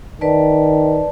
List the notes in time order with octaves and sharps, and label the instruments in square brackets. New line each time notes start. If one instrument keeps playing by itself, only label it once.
[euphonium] D#3 [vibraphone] B4 D5 A5